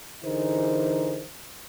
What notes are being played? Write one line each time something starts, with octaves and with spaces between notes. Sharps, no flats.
D3 E3 D#4 G#4 A#4 C5